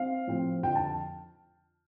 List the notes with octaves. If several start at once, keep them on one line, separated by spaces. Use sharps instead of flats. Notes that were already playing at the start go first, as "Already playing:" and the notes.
Already playing: C4 F5
A2 F3 C4
F2 D3 F3 G5
A5